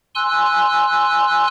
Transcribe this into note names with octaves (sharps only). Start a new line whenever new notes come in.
G#5 C6 E6 F#6